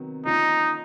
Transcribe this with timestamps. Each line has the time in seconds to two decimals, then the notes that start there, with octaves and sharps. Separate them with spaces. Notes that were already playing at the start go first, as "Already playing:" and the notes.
Already playing: C3 D#3 F#3 B3
0.26 D3 F3 A#3 C#4 D#4 F4